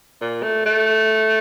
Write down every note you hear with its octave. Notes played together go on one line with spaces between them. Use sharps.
A#2
A3
A3